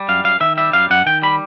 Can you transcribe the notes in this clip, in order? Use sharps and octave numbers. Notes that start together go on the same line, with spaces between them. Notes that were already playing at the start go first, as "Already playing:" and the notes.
Already playing: G3
F#2 F5
F#2 F5
D#3 E5
G3 E5
F#2 F5
F#2 F#5
D#3 G5
G3 B5